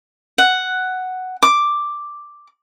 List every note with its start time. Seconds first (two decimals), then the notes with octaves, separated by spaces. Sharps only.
0.38 F#5
1.43 D6